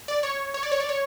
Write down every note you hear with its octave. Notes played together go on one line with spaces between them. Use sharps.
D5
C#5
C#5
D5
C#5
D5
C#5